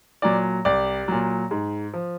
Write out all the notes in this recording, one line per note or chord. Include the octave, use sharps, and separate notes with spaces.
A#2 F#3 D5
C2 D5
A#2 F#3
G#2
F3